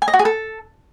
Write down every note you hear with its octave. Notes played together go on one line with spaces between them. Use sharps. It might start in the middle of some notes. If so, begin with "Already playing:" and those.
G#5
D#5
F#4
G#4
A4